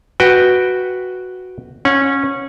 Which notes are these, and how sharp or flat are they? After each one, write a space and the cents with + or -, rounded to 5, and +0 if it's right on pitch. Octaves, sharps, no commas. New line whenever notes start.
F#4 +0 B4 +0 G5 +0
C#4 -15 F#5 -35